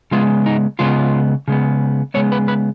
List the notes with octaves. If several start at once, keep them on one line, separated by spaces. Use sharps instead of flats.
C#3 G#3 B3 F4
D#4
C#3 G#3 B3 F4
C#3 G#3 B3
C#3 G#3 B3 C#5
B4
B4